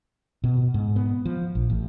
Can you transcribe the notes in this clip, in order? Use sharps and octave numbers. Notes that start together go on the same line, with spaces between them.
B2
G#2
B3
F3
A#1
A1